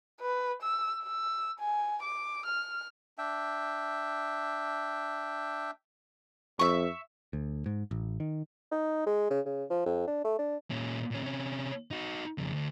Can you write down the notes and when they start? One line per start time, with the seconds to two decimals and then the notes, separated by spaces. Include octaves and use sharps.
0.21 B4
0.62 E6
1.03 E6
1.59 G#5
2.02 D6
2.46 F6
3.18 D4 E5 G5
6.59 F2 E5 C#6
7.33 D2
7.66 G#2
7.91 A1
8.20 D#3
8.72 D#4
9.06 G#3
9.30 C#3
9.46 C#3
9.70 F3
9.86 F2
10.08 D4
10.25 A3
10.39 D4
10.70 A#2 C#4
11.11 A#2 C#4
11.23 C3 C#4
11.91 D#4 F#4
12.38 F2 C#3
12.53 D2